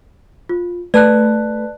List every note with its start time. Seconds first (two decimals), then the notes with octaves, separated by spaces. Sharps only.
0.49 F4
0.94 A3 B4 D5 A5 F#6